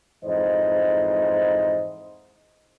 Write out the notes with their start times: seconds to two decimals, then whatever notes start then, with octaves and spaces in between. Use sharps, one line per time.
0.24 F2 G#2 E3 C5 D#5